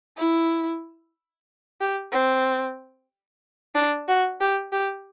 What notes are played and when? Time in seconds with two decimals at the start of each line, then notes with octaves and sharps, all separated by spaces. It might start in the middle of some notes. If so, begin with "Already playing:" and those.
0.17 E4
1.81 G4
2.12 C4
3.75 D4
4.08 F#4
4.41 G4
4.72 G4